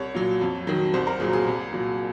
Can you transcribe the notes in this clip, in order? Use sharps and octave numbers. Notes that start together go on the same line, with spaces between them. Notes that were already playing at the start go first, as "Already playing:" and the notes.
Already playing: C2 C#5
A#2 F#3
F2
D#3 F#3
C2 C5
A#4
A#2 F#3 G#4
G#4
C2
A#2 F#3